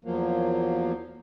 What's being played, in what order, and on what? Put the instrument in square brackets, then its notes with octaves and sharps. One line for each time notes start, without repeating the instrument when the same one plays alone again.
[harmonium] E2 F3 F#3 A#3